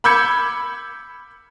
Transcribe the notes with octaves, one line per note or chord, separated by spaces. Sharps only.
B5 D6 E6 G6 G#6 C#7